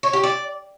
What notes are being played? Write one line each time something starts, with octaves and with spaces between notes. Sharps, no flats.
C#5
G4
D5